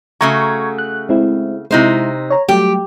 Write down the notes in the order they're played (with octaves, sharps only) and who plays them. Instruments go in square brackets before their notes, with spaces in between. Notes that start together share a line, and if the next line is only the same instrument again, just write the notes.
[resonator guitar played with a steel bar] C#3 A3 F#4 [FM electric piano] A#5 C#6 G#6
[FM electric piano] F#6
G#3 C4 E4
[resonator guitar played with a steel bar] C3 D#4 C5 [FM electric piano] G#3 E4
[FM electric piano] C#5 A#5
[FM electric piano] F#3 G3 A3 [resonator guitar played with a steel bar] G4